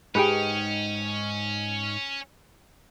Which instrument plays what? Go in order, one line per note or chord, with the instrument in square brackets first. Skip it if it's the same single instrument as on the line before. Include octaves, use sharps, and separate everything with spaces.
[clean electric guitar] G#2 D#4 G5 [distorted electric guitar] C#4 [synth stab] G4 G#4 B4